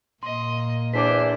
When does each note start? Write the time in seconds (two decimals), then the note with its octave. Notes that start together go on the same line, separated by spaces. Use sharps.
0.23 A#2 A#3 D#5 C6
0.94 E2 E3 D4 C5 D6 B6